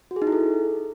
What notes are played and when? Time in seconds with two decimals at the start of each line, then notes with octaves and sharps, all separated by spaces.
0.11 F#4
0.16 G#4
0.22 D#4
0.27 E4
0.32 A4